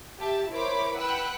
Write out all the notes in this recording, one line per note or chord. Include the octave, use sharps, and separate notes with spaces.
G4 E5 A5
E4 A#4 C5 C#5 B5 D6
B4 F#5 G5 E6 F#6